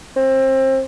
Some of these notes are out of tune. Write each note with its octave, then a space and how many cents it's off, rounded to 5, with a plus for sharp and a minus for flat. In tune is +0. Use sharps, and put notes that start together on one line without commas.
C4 +25